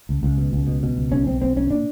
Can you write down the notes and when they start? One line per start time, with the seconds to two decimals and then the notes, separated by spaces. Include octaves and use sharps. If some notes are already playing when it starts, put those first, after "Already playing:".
0.09 C#2
0.23 C#2
0.37 B2
0.53 C#2
0.67 B2
0.83 B2
0.96 C#2
1.11 B1 C#4
1.26 B1 C4
1.42 B1 C4
1.56 B1 C#4
1.70 A#2 D4